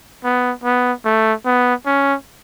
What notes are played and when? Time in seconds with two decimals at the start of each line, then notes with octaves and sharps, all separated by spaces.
0.24 B3
0.64 B3
1.05 A3
1.46 B3
1.86 C#4